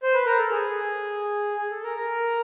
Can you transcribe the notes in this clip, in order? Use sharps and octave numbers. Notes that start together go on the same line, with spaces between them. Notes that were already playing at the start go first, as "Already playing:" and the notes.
C5
B4
A#4
A4
G#4
G#4
A4
A#4
A#4